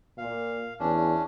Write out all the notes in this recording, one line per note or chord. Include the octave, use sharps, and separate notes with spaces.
A#2 F5
E2 C#4 D4